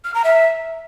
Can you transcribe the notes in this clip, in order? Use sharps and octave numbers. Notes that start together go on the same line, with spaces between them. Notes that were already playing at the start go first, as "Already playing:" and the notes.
F6
A#5
E5